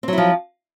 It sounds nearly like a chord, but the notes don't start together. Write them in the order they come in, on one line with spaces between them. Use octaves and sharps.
C4 F#3 E4 F3